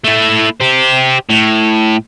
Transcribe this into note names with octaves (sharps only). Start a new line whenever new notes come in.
A3 E4
G4 C5
A2